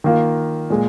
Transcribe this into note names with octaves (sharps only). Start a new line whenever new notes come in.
D#3 A#3 F4
A#2 G#3